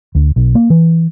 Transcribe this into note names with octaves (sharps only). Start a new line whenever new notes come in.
D2
B1
A#3
E3